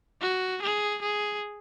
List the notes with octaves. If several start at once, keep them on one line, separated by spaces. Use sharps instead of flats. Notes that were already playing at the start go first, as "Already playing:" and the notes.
F#4
G#4
G#4